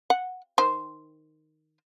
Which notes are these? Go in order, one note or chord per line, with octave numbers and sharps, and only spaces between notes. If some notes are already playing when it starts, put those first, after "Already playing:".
F#5
D#3 C5